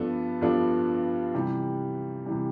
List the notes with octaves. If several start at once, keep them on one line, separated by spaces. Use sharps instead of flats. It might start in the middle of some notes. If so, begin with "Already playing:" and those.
Already playing: G2 F3 B3 D4 A4
G2 F3 B3 D4 A4
C3 E3 G3
C3 E3 G3